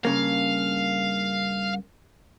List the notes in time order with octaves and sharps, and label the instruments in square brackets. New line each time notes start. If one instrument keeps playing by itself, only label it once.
[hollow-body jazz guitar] G2 C#3 A#3 [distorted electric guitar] F5